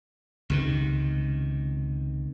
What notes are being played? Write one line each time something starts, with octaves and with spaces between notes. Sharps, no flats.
C#2 C3 D#3